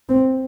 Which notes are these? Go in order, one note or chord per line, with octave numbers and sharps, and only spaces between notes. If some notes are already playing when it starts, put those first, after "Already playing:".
C4